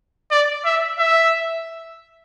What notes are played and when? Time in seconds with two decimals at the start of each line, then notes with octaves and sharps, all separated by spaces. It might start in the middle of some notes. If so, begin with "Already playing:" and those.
0.31 D5
0.65 E5
0.99 E5